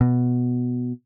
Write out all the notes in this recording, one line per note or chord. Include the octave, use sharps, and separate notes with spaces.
B2